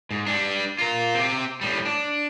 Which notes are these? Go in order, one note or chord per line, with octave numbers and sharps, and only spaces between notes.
G#2
G3 D4
F4 A#4
C4 G4
A2 G3
D4